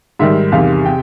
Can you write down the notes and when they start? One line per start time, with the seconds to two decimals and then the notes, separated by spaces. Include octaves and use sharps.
0.19 G#2 D#3 G3 E5
0.52 E2 C3 D#3 F5
0.85 C3 G5